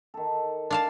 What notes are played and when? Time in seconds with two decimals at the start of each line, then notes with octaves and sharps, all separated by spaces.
0.14 D#3 A4
0.70 D4 F5 A5